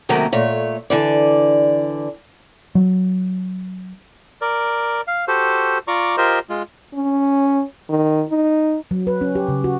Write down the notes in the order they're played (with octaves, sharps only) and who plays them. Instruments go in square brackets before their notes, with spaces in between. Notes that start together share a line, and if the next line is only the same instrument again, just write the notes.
[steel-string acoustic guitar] C3 D#3 F#3 A3 A#3 C#4
A#2 A3 C#5
D3 E3 D5
[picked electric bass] F#3
[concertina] A#4 D5
F5
F#4 G4 A4 C5
F4 D5 A#5 C#6 D6
F4 G4 A#4 C5 D#5
G#3 F4
[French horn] C#4
D#3
D#4
[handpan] F#3
B4
C#4
G4
C#3
F#4